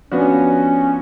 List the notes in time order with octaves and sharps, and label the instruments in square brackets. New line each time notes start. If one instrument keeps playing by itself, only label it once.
[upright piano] F3 B3 D4 F#4 [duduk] C#4